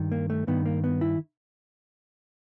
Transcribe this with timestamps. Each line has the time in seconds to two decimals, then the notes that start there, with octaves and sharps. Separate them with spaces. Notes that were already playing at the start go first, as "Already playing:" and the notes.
Already playing: G2 D#3
0.12 A#3
0.30 A3
0.47 G2 D#3 B3
0.66 A#3
0.84 B3
1.01 E4